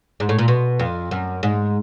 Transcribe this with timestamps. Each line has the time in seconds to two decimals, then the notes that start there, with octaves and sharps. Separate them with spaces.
0.20 G#2
0.29 A2
0.39 A#2
0.48 B2
0.79 F2
1.11 F#2
1.43 G#2